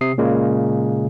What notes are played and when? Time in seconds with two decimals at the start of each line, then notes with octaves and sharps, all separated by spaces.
0.01 C3 D#6 C7
0.18 A#2 C#3 G#3 A#3